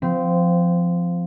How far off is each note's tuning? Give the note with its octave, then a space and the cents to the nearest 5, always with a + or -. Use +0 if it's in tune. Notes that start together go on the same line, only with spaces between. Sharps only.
F3 +0 C4 -15